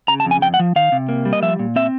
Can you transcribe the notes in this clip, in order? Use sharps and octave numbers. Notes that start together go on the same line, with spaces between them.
C#3 A#5
A5
F2
G#5
F2 G5
F#5
F3
D#3 F5
C3
A#3
G3
D#5
F3 E5
A#2
C4 E5